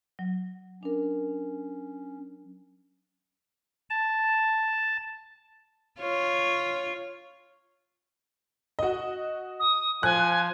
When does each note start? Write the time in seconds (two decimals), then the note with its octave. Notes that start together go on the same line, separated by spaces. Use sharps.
0.19 F#3
0.83 C#4 D4 A#4
3.90 A5
6.00 F4 C#5
8.79 F#4 D#5
9.60 D#6
10.03 F3 G#5 F#6